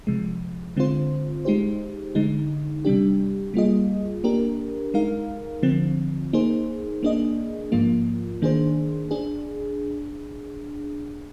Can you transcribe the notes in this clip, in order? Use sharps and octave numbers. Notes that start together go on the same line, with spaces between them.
C3 F3 G#3
D3 G#3 C4 F4 C5
G#3 D#4 G4 C5
D3 G#3 D#4
C3 G3 D4 G4
G3 A#3 F4 G#4 D#5
A#3 D4 G4 A#4
G#3 D#4 A#4 F5
D3 F3 C4
A#3 D#4 G#4 C5
A#3 D4 G#4 D#5
G#2 F3 A#3 F4
D#3 A#3 D4 G#4 C5
D4 G#4